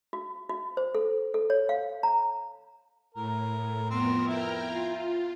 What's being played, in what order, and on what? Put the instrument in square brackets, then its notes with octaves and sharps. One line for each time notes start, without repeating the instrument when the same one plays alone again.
[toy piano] F#4
F#4
C5
A4
A4
C#5
F5
A#5
[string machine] A2 [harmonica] A#4
[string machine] F2 B3 A#4 [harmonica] C4
[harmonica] E4 [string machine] G5 A#5 F6
[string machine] F4